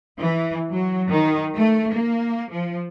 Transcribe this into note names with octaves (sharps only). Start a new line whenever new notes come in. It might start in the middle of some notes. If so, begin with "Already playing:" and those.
E3
F#3
D#3
A3
A#3
F3